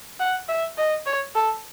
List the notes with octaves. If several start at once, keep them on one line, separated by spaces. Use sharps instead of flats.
F#5
E5
D#5
C#5
A4